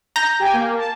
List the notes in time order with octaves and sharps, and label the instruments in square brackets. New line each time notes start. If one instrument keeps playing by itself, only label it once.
[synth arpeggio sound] A#5 G6 A#6
[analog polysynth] G4 G5 G#5
A#3
A5